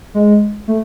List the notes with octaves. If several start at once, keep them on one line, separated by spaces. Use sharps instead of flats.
G#3
A3